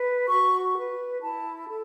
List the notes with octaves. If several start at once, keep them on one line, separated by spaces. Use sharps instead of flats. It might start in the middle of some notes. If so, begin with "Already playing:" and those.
Already playing: B4
F#4 C#6
B4
E4 A5
A4